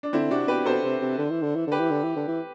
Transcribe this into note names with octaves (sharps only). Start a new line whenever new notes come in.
D4
D3 C4 E4
C3 D4 F#4
B2 G4 B4
B2 A4 C5
C3
C3
D3
E3
D3
E3
D3 G4 B4
E3
D3
E3
D3
E3